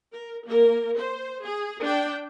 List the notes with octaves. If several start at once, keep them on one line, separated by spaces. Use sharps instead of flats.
A#4
A#3 A#4
C5
G#4
D4 G5